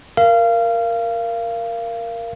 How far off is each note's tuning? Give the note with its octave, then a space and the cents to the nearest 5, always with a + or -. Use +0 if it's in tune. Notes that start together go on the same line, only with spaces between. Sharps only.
A#4 +0 F5 -25